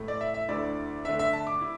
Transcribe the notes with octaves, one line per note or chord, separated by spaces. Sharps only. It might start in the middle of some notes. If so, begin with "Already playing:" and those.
Already playing: A2 A3 E4
D5
E5
E5
D2 D3 A3 E4 D5
D3 A3 D4 E5
E5
A5
D6
E4